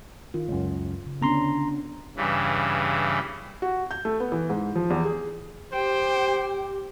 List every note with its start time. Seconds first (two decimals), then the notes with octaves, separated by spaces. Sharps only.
0.34 D#3 F4
0.48 C#2 F#2
1.06 C#3
1.21 D3 B3 C#4 D4 A#5 C6
2.17 G2 C#3 E3
3.62 F#4
3.91 G6
4.05 A3
4.20 B3
4.32 E3
4.49 G#2
4.76 F3
4.90 E2
5.05 G#4
5.72 G4 C5 G5